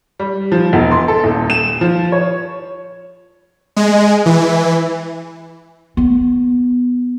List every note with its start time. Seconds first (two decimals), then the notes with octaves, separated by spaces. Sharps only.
0.20 G3
0.52 F3
0.73 E1
0.91 C6
1.08 A4
1.24 D#1
1.50 E7
1.81 F3
2.12 C#5
3.76 G#3
4.26 E3
5.97 B3